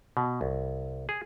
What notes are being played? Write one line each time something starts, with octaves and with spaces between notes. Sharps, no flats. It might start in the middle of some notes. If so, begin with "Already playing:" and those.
B2
C2
G#4